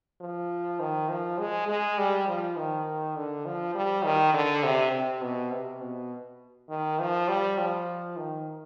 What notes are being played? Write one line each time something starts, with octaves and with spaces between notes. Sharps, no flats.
F3
D#3
F3
G#3
G#3
G3
F3
D#3
D3
F3
G3
D#3
D3
C3
C3
B2
C3
B2
D#3
F3
G3
F3
D#3